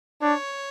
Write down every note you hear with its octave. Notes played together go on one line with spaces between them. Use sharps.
D4 C#5